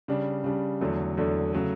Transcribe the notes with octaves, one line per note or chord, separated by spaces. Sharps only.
C#3 G3 D4
C#3 G3 D4
E2 D3 F#3 A3 D4
E2 D3 F#3 A3 D4
C#3 F#3 A3